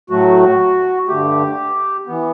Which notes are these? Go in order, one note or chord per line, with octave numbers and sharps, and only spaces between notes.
A2 F#3 A3 F#4
G2 D3 A3 G4
E3 B3